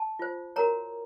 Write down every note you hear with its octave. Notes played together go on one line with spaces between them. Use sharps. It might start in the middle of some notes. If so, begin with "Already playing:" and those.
Already playing: A5
F4 C5
F#4 A#4 C#5 A#5